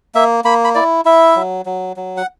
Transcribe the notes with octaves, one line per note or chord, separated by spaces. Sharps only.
A#3 E5
A#3 B5
B5
E4 D5
E4 E5
F#3
F#3
F#3
F#5